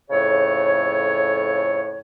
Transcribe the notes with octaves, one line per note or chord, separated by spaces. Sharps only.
F2 A2 C#3 A4 C#5